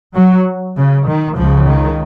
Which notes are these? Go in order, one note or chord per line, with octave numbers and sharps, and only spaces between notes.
F#3
C#3
D#3
C#2 C#3 F3
D#3